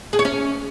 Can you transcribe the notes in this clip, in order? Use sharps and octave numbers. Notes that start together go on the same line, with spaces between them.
G#4
C#5
C#4